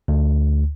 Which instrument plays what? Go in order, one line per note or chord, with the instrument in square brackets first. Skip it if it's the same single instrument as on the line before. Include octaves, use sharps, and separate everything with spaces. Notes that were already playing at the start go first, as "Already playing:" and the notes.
[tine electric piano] D2